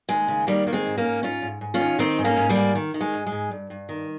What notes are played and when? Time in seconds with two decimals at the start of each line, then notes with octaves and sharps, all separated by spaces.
0.09 D#2 G#3
0.28 C#3
0.47 D#3 G3 A#3
0.66 D#3 A#3
0.73 G#3 C4
0.86 G#2
0.98 A#3 C#4
1.04 G#2
1.23 G#2 C#4 F4
1.42 G#2
1.61 G#2
1.74 C#4 F4
1.80 D#3
1.99 D#3 C4 D#4
2.18 G#2
2.24 A#3 C#4
2.37 G#2
2.49 G3 A#3
2.56 G#2
2.75 D#3
2.94 D#3
3.01 G#3
3.14 G#2
3.26 G#3
3.32 G#2
3.51 G2
3.70 G2
3.89 D#3